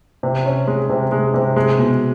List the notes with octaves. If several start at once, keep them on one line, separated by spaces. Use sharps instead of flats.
C3
C#4
G#3
C3
G#3
C3
G#3
B2